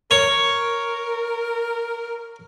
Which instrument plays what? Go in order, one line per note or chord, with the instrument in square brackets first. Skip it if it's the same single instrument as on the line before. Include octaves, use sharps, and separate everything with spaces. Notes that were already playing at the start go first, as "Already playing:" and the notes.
[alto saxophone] A#4 [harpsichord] C#5